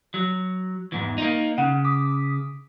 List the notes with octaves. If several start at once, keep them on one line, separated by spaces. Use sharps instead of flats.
F#3
E2 G#2 E3
A#3 D#4
C#3 F#5
D6 D#6 B6